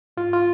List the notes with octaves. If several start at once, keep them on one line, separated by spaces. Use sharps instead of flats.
G#2 F4
F4